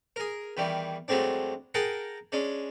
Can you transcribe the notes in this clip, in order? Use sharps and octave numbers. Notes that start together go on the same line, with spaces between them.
G#4 A#4
E2 D#3 E3 G3
G2 F#3 G#3 A3 C4 D4
G#4 A#4 F#5 G5 A5 A#5
G#3 C#4 D4